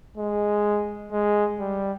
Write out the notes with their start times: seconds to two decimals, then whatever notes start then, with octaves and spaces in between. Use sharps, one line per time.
0.17 G#3
1.12 G#3
1.59 G3